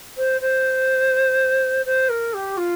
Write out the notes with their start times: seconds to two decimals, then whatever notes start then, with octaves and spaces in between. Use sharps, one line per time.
0.17 C5
0.41 C5
1.86 C5
2.09 A#4
2.34 G4
2.57 F4